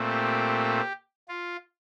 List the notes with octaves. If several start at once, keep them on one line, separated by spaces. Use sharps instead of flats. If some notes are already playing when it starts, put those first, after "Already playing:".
Already playing: A#2 A3 C4
G4
F4